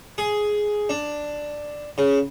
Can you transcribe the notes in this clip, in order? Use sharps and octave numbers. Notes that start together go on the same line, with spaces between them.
G#4
D4
C#3